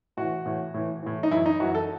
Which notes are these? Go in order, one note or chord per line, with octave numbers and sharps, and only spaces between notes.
A2 E3 F#4
A2 E3
A2 E3
A2 E3
D#4
F#2 E3 E4
D#4
F#2 E3 F#4
A4